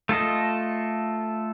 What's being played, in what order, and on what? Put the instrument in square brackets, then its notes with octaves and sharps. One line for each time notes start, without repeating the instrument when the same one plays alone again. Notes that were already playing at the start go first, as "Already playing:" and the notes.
[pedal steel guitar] A3 F4 A4 D#5